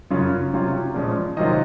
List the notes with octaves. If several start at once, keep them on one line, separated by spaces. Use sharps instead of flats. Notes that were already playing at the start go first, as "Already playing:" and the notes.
F#2 C#3 F#3 C#4 F4
C3 F#3 C#4 F4
A#2 F3 G#3 C#4
C3 D#3 F#3 C4 F4 D#5